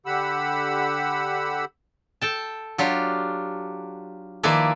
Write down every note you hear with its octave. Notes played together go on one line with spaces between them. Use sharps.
D3 G4 F#5 B5 E6
A4 G5 A5
F#3 D4 F4 G4
D#3 F3 A#3 E4 B4 D5